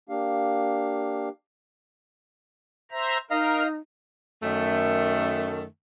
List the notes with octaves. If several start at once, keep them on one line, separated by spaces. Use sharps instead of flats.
A#3 D4 G4 F5
C5 E5 A#5
D#4 A#4 D#5 F5 A#5
F#2 D#3 A3